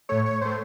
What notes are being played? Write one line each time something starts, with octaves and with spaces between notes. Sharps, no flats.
A2 A3 C#5
C#5
A2 A3 C5